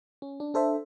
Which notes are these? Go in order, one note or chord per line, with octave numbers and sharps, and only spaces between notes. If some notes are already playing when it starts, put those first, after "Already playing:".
C#4
D4
D4 A4 C5 E5